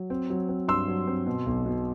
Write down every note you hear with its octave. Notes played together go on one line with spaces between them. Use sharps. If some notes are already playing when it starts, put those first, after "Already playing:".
Already playing: F#3
C4
F#3
C4
G2 C6 E6
F#3
C4
B2
B1
B2